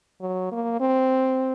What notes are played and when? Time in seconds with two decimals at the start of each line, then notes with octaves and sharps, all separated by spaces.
0.21 F#3
0.52 A#3
0.81 C4